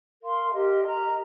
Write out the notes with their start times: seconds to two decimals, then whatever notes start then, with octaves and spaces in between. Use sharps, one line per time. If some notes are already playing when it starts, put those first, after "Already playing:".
0.22 A#4 F5 C6
0.53 G4 A#4 D#5
0.83 A#4 D#5 A#5